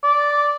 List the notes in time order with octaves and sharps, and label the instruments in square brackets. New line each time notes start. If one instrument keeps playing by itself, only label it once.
[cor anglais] D5